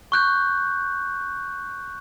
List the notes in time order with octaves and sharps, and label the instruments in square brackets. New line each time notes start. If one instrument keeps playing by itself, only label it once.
[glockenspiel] C#6 F#6 G6